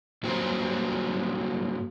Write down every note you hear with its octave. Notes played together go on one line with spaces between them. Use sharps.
G2 F#3 A#3 C5